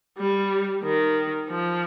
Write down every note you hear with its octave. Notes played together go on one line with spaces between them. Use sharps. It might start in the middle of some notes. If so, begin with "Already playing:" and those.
G3
D#3
F3